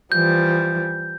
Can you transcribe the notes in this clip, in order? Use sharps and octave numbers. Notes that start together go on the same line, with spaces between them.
E3 F3 G3 G6